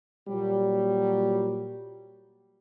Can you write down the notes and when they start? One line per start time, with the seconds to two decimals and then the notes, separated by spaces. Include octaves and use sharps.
0.29 A#2 F#3 G3